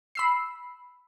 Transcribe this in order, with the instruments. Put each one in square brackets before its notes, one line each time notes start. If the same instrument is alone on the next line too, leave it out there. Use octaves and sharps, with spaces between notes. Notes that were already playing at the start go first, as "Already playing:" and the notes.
[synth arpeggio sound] B5 E6 C7